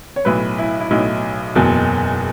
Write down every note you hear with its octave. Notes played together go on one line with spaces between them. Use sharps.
C#5
B1 A2 F#3 B4
E4
E4
B1 A2 F#3 D#4
F#1 E2 B2 F#3